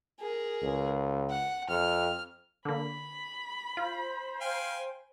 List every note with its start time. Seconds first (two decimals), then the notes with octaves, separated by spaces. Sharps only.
0.19 G#4 A#4
0.63 C#2
1.30 F#5
1.69 F2 F6
2.65 D3 A#3 B5
3.77 F4 C5
4.41 F5 G5 G#5